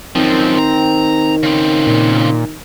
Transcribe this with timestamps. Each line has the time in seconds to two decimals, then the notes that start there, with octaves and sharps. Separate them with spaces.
0.15 F#2 D#3 F3 C4
0.59 A#5
1.43 C#3 C4
1.87 A#2